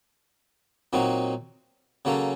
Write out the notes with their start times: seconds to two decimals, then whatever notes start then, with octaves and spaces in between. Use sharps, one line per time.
0.93 A#2 F#3 C4 D#4 F#4
2.05 C#3 F#3 A#3 C#4 A4